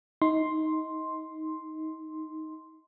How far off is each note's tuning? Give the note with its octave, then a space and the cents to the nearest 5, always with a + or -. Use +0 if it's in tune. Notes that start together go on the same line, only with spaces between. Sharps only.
D#4 +20 C6 +0